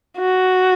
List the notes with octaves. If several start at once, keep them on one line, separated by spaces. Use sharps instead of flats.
F#4